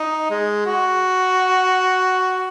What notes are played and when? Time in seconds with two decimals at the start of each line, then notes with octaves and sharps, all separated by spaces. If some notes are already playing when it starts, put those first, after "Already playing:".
Already playing: D#4
0.30 G#3
0.66 F#4